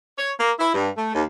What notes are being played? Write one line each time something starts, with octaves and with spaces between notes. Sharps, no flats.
C#5
A#3
E4
G2
A3
D#2